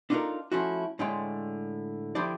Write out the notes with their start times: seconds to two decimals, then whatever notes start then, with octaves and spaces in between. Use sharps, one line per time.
0.10 D4 D#4 F4 F#4 A4 A#4
0.52 F3 A3 C#4 E4 F#4
0.99 A2 D3 G#3 C#5 G5 C6
2.15 D3 F3 E4 G4 C5 D5